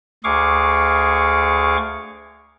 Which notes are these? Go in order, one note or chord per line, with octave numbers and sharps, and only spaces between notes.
D2 G#4 F5 C#6 D6